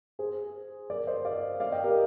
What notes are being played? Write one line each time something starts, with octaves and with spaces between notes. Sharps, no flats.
G#4 C5
A#4 D5
C5 D#5
D5 F5
D5 F5
D#5 G5
G4 A#4